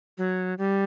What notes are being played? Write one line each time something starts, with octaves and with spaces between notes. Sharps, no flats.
F#3
G3